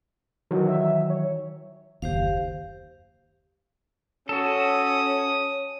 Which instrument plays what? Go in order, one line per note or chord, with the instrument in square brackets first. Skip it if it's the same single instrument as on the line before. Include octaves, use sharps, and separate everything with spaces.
[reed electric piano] D#3 E3 F#3
[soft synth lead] E5
C#5
[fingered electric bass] F#1 D#2 [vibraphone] G4 C5 F5
[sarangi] C#4 [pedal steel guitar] F#4 A4 [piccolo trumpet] D#6